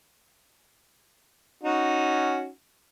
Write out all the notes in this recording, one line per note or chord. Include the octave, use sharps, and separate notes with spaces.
C#4 D#4 F#4